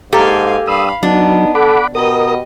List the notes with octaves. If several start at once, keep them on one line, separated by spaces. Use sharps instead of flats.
G#2 A#3 G4 A4 F5 G#5
G2 F5 B5 D#6 E6
F#3 B3 D4 D#4
A4 F#5 B5 D6
B2 G4 A#4 D#5 D#6